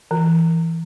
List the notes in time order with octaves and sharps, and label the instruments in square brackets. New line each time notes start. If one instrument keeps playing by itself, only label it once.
[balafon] E3